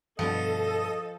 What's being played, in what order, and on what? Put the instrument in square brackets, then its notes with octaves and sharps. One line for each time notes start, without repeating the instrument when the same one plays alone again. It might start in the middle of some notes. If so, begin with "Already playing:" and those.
[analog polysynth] G2 B2 [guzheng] F3 [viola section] A4 [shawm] D#5